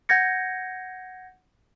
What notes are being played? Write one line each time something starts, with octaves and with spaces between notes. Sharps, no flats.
F#5 G6 G#6 A#6 C#7